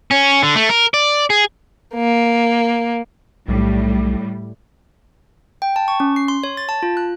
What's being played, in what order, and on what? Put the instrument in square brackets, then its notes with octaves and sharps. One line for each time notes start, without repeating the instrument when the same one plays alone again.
[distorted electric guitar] C#4
D3
A3
A#4
D5
G#4
[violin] A#3
[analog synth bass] B1 [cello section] A2 G3
[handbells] G5
A5
C#6
C#4
C7
C6
C#5
A6
A5
F4
F#6